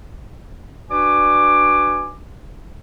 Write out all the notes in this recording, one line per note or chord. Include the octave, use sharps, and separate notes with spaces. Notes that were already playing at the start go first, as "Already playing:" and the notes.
D4 F#4 B4 D5 G#5 D6